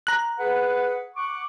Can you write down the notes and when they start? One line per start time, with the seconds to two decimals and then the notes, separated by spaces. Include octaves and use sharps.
0.07 A#5 F#6
0.39 G#4 B4 F#5
1.16 F#5 C#6 D6